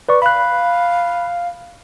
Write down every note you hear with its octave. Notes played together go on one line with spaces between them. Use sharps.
B4 D5 C#6
F5 B5 F#6